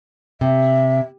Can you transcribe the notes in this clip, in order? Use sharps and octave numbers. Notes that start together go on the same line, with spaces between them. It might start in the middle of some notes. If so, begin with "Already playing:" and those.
C3 E5